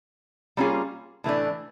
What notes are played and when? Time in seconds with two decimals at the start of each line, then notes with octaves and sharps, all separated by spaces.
0.57 G3 A#3 C#4 F4 G#4
1.24 A2 E3 A3 D4